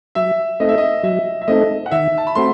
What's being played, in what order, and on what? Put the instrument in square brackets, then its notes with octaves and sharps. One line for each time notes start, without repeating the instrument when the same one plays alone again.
[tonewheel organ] F#3 [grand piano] E5
[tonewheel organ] A3 C4 D#4 A4 [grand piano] D#5
[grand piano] E5
D#5
[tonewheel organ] F#3 [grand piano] E5
[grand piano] E5
[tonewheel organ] A3 C4 D#4 A4 [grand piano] D#5
[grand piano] F#5
[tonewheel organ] D#3 [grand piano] E5
[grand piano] A5
B5
[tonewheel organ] A3 C4 F#4 [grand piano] C6